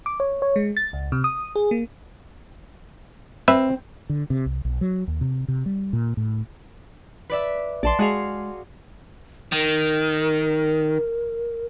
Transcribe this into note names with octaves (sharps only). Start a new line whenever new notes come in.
D6
C#5
C#5
G#3
A6
C#2
C3
D#6
G#4
A#3
C4 B4 E5
D3
C3
C2
B1
F#3
D#2
C3
C3
G3
A#2
A2
B4 D5 E5
A#1 D5 A5 C6
G#3 F#4 G#4 F5
D#3 A#4